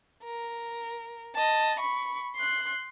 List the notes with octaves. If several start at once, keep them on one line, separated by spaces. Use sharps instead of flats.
A#4
D#5 A5
B5 C#6
C6 F#6